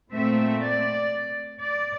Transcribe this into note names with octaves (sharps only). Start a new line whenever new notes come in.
A#2 A3 C4 E5
D5
D5